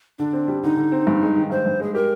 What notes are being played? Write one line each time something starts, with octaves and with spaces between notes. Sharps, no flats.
D3 D4
C4
G3
D3 D#4
D3
C4
G2
G#3
D#3
G2 C5
G2
G#3 G#4
G4 A#4